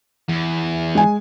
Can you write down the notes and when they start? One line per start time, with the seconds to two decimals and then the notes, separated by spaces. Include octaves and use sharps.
0.29 E2
0.95 G#3 G#5